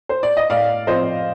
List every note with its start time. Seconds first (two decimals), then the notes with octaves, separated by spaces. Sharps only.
0.09 C5
0.23 D5
0.37 D#5
0.49 A2 D5 F5
0.87 F3 C4 C5 D#5